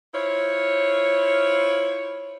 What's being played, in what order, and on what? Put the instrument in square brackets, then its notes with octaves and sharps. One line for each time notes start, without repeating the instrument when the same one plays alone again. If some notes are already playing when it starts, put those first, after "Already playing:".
[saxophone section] E4 F4 C5 C#5